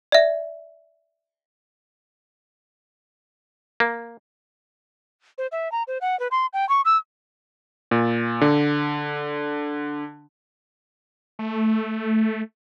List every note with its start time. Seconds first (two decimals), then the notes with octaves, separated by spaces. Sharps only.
0.12 D5 E5
3.80 A#3
5.38 C5
5.52 E5
5.72 A#5
5.88 C5
6.01 F#5
6.20 B4
6.31 C6
6.53 G5
6.69 C#6
6.85 E6
7.91 A#2
8.41 D3
11.39 A3